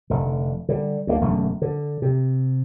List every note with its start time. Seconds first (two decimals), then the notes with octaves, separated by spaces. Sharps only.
0.10 F1 D3
0.69 D3 G3
1.07 D2 G#3 A#3
1.21 E1 F#2 D3 A3
1.62 D3
2.02 C3